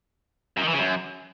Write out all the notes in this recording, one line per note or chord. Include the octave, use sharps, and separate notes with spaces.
F#2
D#3
E3
C#3
F#2